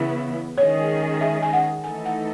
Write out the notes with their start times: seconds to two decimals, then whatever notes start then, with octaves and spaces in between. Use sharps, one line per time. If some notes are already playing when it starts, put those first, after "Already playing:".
Already playing: C#3 E3 B3 E4
0.58 D#3 G#3 C#4 G#4 C#5 D#5
1.21 E5
1.42 G#5
1.53 F#5
1.84 E3 A3 D#4 A4 G#5
2.05 F#5